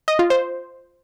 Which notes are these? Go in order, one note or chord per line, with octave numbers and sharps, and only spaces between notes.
D#5
F4
C5